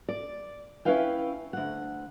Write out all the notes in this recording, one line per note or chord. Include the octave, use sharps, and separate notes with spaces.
D5
C#4 D4 E4 B4 F5 G5
D2 F#5